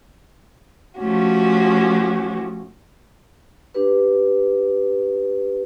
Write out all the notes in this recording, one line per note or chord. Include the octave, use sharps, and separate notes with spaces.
F3 A3 C#4 F#4 G4
D4 G4 B4